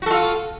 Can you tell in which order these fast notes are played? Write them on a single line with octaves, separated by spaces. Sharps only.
F#4 A4 F4